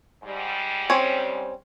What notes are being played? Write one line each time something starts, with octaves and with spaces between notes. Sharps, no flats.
G#2 G3
C4 C#4 C#5